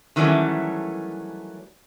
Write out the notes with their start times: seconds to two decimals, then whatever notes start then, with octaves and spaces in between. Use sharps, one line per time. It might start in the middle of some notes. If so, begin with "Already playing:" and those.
0.16 D#3 E3 F#3 G3 A3 C#4